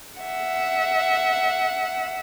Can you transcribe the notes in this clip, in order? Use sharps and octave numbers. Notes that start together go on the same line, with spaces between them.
E5 F#5